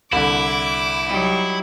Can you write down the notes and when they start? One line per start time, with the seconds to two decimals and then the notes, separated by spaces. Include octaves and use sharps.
0.12 C2 D3 E4 D6
1.06 F#3 G3 D#4